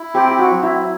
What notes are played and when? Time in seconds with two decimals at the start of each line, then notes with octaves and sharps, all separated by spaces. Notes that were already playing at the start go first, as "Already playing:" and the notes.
Already playing: E4
0.15 C4 G4
0.28 G4
0.39 F#4
0.51 F#3
0.63 E4